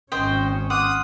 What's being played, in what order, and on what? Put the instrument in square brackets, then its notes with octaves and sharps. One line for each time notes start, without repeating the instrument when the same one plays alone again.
[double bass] G#1 C#4 [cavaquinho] C5 D#5 G5
[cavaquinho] F#5 [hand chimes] C6 D6 F6 [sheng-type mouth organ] D#6